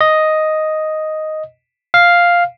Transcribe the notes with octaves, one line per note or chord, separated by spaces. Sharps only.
D#5
F5